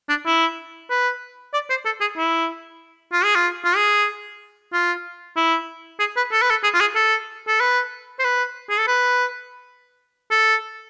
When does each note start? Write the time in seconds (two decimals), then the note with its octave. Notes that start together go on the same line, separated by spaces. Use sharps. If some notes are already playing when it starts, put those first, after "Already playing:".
0.09 D4
0.26 E4
0.90 B4
1.54 D5
1.70 C5
1.86 A4
2.01 G#4
2.18 E4
3.13 F4
3.24 G#4
3.35 F4
3.65 F4
3.76 G#4
4.73 F4
5.36 E4
6.00 G#4
6.17 B4
6.32 A4
6.42 B4
6.50 A4
6.63 G#4
6.74 F4
6.80 G#4
6.95 A4
7.48 A4
7.60 B4
8.19 C5
8.24 B4
8.70 G#4
8.79 A4
8.87 B4
10.31 A4